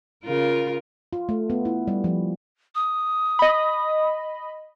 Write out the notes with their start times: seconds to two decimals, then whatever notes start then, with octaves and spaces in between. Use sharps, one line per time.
0.24 C#3 F4 A#4
1.13 F4
1.29 A3
1.50 B3
1.65 E4
1.88 G3
2.04 F3
2.75 D#6
3.39 D#5 B5